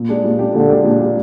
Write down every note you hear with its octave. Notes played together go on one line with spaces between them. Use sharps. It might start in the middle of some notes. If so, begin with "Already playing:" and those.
Already playing: A#2
G#3 D4 G4
A#2
G#3 D4 G4
A#2 D3
G#3 D4 G4
A#2
G#3 D4 G4